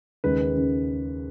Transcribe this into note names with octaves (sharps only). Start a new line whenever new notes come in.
D#2 C#3 G#3 B4
B4
C#3